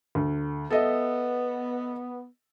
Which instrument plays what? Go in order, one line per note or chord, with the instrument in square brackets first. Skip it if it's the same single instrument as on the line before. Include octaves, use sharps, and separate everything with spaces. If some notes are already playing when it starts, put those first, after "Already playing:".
[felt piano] D2
[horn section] B3 [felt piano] A4 D#5 E5